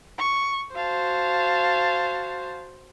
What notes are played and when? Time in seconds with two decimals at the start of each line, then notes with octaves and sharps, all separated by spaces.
0.18 C#6
0.75 F#4 C5 F5 A5